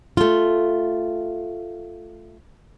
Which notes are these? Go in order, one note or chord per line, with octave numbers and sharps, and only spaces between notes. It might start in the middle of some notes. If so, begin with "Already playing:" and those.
A3 F4